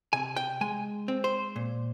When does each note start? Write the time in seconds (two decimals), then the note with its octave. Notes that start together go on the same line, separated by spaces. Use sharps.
0.13 C3 G#5
0.36 G5
0.61 G#3 G#5
1.08 C4
1.24 C5
1.56 A#2